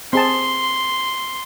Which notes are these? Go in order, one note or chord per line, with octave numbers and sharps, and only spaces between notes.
C4 G#4 A5 C6